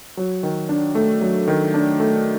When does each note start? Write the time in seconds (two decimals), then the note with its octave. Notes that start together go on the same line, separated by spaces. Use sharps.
0.17 F#3
0.43 D#3
0.69 D4
0.95 A3
1.21 F#3
1.48 D#3
1.74 D4
2.00 A3